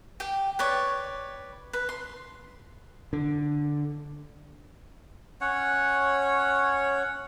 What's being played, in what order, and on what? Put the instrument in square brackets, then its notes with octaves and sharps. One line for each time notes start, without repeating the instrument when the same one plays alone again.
[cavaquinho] G4 G5
B4 C#5 D5
B4
C6
[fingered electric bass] D3
[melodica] C#4 C#5 F#5